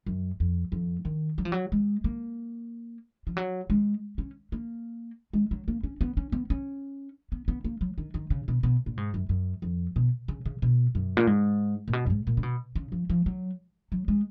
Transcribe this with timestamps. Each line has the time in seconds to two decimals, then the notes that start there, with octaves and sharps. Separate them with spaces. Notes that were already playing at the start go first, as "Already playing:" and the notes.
0.06 F#2
0.40 F2
0.72 F2
1.05 D#3
1.38 F#3
1.45 F3
1.52 F#3
1.72 G#3
2.04 A#3
3.27 F3
3.37 F#3
3.70 G#3
4.18 C#4
4.52 A#3
5.33 G#3
5.51 F#3
5.68 A#3
5.83 C#4
6.01 B3
6.17 C#4
6.32 B3
6.50 C#4
7.32 B3
7.48 B3
7.64 A#3
7.81 F#3
7.98 D#3
8.14 D#3
8.30 C#3
8.48 B2
8.63 B2
8.86 A#2
8.97 G#2
9.14 F#2
9.29 F#2
9.62 F2
9.96 B2
10.28 C#3
10.46 C#3
10.62 B2
10.95 F#2
11.17 A#2
11.27 G#2
11.88 A#2
11.93 B2
12.06 F#2
12.10 G#2
12.27 A#2
12.37 C#3
12.43 B2
12.75 C#3
12.92 F3
13.10 F3
13.26 F#3
13.92 F#3
14.08 G#3